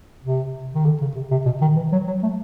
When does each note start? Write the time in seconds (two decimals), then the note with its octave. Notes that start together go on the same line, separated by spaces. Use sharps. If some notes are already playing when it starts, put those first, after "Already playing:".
0.24 C3
0.74 D#3
0.86 D3
1.01 C#3
1.15 C3
1.31 C3
1.46 B2
1.61 D#3
1.76 E3
1.92 F#3
2.07 F#3
2.23 A3